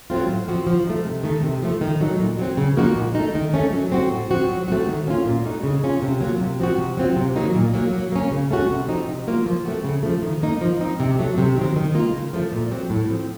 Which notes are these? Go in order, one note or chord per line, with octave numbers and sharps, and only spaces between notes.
F#3 A3 C4 F4
A2
F3 C4 F#4
F3
A3 D#4
C3
D#3 A3
C3
F3 A3
D#3
F#3 A3 D#4
A#2
F#3 C4
C#3
F3 A#3 D#4 F#4
A#2
A3 D#4
D#3
A3 C#4
F#3
C4 F#4
A2
F3 C4 F#4
F#3
A3 C4 F#4
D#3
A#3 C#4 F4
A#2
A3 D#4 F#4
C#3
A3 C#4 F4
C3
F#3 A#3 F4
C3
F3 C4 F#4
C3
F#3 C4 F4
C3
D#3 F#3 A#3 D#4
A#2
F#3 A#3
F#3
A#3 C#4
C#3
A3 C#4 F#4
C3
F3 C4 D#4
C3
F#3 A#3 F4
F3
A3 C4 F#4
C#3
F3 A3
D#3
A#3 D#4
F3
C4 D#4
C3
F#3 A3
C3
D#3 F#3 C4
D#3
A#3 F4
C#3
F3 A3
A#2
F#3 C4
A2
F3 C4